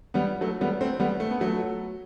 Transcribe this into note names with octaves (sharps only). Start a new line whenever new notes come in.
G3 B3
F#3 A3
G3 B3
A3 C4
G3 B3
A3
B3
F#3 A3